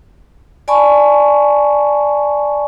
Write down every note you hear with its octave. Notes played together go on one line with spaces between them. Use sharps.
D5 G#5 A5 B5 C#6